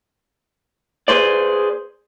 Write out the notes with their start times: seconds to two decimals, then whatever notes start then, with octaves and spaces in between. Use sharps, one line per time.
1.08 G#4 B4 C5 D5